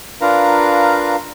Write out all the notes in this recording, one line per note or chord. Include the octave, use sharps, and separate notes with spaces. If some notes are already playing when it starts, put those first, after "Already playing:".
D4 F4 A#4 B4 F5 A#5